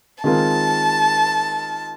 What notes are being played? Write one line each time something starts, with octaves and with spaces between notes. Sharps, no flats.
D#3 G#3 C4 F4 A#4 A5